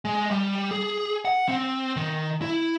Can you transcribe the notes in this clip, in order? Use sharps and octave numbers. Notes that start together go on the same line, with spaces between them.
G#3
G3
G#4
F#5
C4
D#3
E4